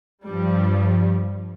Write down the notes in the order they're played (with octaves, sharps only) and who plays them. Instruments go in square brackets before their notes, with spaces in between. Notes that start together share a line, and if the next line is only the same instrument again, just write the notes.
[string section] G2 F3 G3